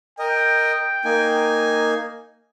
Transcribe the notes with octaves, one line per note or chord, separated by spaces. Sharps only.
A#4 D#5 G5
A#3 D#4 G#5